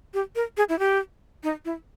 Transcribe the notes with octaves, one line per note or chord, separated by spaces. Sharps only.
G4
A#4
G#4
E4
G4
D#4
E4